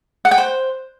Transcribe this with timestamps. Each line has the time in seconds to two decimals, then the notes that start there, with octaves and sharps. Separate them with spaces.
0.25 F#5
0.31 G5
0.38 C5